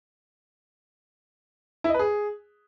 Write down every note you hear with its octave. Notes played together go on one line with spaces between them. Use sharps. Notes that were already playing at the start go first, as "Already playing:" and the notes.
E4
D#5
B4
G#4